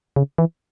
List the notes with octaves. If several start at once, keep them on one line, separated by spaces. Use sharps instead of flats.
C#3
E3